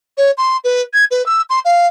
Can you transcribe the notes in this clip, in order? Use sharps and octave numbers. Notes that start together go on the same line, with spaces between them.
C#5
C6
B4
G#6
B4
E6
C6
F5